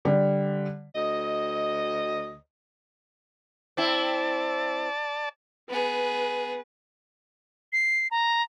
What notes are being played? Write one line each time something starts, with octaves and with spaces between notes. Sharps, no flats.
D3 G3
D2 D#5
C4 E4 D5 A5
B3 G#4 B4
C7
A#5